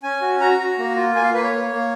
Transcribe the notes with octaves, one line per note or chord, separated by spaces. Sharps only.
C#4 G#5
F#4
F#4 A#5
F#4
A#3
F4
A#3 G#5
F5
A#3 B4
C#5
A#3
A#3